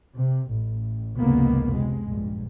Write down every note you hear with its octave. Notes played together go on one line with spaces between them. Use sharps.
C3
A1
F1 C#2 G#2 A#3 B3
C3 G#3
A#1 G2